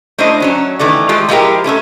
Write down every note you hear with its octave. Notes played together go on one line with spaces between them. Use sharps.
A3 D4 E4 C5 D#5
F#2 F#3 C#4
D#3 E3 A3 D5
G#3 A3 F4 G4
F3 G#3 E4 F4 G4 A#4
A3 C#4 B4 E5